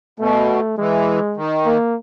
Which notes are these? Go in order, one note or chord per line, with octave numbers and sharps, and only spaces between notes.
B2 A3
E3 G#3
D#3
A#3